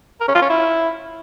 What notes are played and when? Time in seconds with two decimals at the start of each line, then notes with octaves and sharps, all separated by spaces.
0.21 A#4
0.28 C#4
0.35 F4
0.42 C#4
0.49 E4